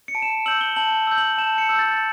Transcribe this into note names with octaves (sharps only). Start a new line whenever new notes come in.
C#7
A5 D7
E7
D7
E6 G6 F#7
G7
A5 F#7
E6 G6
F#7
A5 E7
C#7
E6 G6
A6